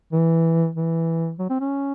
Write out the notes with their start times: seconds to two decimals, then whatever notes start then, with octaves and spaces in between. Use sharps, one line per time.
0.13 E3
0.76 E3
1.39 F#3
1.50 C4
1.61 C#4